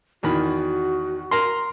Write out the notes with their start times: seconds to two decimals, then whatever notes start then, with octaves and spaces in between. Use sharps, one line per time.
0.23 E2 D#3 F#4 B5
1.31 A#4 A#5 C6